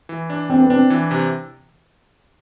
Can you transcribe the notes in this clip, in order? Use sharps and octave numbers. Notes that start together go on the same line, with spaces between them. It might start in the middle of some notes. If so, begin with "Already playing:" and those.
E3
D4
C4 D4
B3
C4 D4
E3
C3